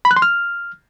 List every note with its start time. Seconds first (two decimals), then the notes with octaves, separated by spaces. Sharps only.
0.05 B5
0.11 F#6
0.16 C6
0.22 F6